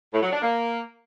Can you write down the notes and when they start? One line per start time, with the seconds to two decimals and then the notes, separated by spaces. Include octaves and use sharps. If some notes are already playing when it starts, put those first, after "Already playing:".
0.13 A2
0.22 F#3
0.32 D4
0.42 A#3